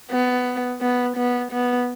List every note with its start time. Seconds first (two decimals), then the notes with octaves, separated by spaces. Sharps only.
0.11 B3
0.81 B3
1.17 B3
1.52 B3